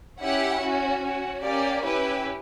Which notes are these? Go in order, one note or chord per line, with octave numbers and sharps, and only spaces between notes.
C#4 E4 G4 F#5
C#4 F#4
C#4 F#4
A#3 C#4 G4 D5
C#4 E4 G4 B4